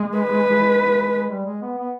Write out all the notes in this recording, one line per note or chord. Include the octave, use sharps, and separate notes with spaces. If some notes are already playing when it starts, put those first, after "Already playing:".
Already playing: G#3
B4
G#3
G#3
G#3
G3
G#3
B3
B3